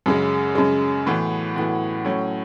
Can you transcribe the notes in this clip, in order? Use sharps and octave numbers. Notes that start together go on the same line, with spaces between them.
F#2 C#3 G#3
F#2 C#3 G#3
A2 E3 B3 F#4
A2 E3 B3 F#4
A2 F#3 C#4